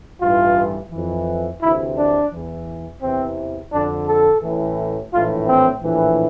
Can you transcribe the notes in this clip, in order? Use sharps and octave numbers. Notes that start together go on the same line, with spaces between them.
A1 G2 E3 F4
F2 E3
D2 C3 E3 E4
D4
E2 E3
E2 C3 E3 C4
F2 D3 D4
A4
A1 A2 E3
A#1 A2 E3 F4
C4
A#1 A2 E3